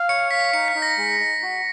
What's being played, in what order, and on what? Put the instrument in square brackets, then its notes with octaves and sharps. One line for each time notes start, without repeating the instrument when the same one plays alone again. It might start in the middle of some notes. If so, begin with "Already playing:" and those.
Already playing: [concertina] F5
[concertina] C#5 [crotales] C#7
[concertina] F5 [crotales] B6
[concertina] D#4 [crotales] C#7
[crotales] B6
[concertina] D#4
[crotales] A#6
[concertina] G#3
D#4
F#4